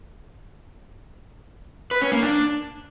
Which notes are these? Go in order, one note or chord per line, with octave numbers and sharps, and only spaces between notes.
B4
C#4
A#3
D4